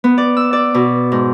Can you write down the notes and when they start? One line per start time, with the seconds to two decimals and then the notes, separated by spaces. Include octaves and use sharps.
0.04 B3
0.18 D5
0.37 E6
0.53 D5
0.74 B2
1.12 G#2